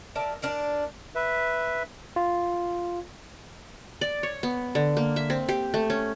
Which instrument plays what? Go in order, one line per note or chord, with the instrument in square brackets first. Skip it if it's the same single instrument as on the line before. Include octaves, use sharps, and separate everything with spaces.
[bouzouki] A#4 D5 E5 A5
D4 A#4 D5
[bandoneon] B4 E5
[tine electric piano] F4
[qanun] D5
C#5
B3
D3
A#3
E5
C4
G4
A3
C#4